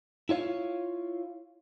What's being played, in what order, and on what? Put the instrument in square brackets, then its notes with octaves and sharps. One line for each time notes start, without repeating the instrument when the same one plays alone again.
[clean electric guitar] E4 F4 C#5 F5